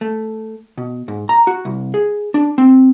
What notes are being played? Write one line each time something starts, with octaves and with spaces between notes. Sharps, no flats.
A3
B2
G#2
A#5
F#4
C2
G#4
D4
C4